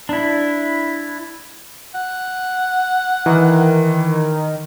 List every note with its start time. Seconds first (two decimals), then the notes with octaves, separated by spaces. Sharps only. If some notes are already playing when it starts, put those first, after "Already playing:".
0.09 D4 E4
1.94 F#5
3.26 D#3 E3